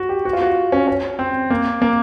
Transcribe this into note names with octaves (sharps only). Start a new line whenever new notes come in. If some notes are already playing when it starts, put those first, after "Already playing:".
Already playing: F#4
G4
F#4
F4
F#4
C#4
C#4
C4
A#3
A#3